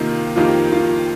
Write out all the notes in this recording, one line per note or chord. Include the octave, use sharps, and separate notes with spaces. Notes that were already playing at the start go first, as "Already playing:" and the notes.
Already playing: C3 D#3 A#3 D#4 F4
F2 D#3 A#3 D#4 F4 G4
F4